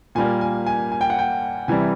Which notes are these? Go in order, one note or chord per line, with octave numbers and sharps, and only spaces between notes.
A#2 G3 A#3 G#5
G#5
G#5
G#5
G5
F#5
G5
C3 E3 G3 G#5